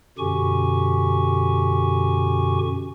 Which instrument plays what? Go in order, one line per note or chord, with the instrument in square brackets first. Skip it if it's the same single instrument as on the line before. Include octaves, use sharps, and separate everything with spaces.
[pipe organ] F#2 B2 D3 G4 G#5 C#6